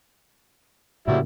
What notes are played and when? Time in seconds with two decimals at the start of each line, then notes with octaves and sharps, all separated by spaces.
1.08 A2 C#3 F#3 G3 A#3 E4